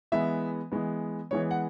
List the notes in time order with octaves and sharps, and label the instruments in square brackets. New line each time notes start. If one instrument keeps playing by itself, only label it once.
[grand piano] E3 G#3 B3 E5
E3 G#3 B3
E3 G#3 B3 C#5
F#5